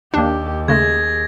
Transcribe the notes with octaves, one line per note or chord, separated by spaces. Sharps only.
D#2 A#3 D4 G4
C#3 G#3 A3 G#4 G#6 A#6